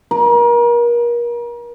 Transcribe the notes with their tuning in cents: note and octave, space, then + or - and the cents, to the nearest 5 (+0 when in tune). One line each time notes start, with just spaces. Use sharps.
A#4 +35